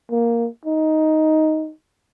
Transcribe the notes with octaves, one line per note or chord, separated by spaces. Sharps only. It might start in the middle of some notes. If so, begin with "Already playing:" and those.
A#3
D#4